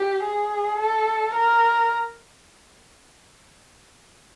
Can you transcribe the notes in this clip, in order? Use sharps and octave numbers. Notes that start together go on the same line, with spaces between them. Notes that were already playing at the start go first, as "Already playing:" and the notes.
Already playing: G4
G#4
A4
A#4